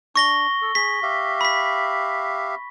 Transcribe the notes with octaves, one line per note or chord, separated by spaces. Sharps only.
D4 C#6 A#6 G7
A4
G#4 B6
G4 E5 F5
B5 B6